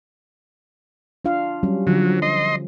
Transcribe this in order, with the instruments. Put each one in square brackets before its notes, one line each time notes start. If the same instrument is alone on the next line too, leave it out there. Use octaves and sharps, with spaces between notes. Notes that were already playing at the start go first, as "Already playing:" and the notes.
[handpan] D4 F4 F5
F#3 G3 C#4
[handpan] D3 F3 [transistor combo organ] F#3
[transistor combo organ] D#5 C6